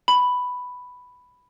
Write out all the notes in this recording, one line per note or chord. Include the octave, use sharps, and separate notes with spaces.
B5